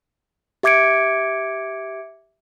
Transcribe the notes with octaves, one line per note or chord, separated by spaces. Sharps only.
G4 E5 D6 G#6 C#7 D7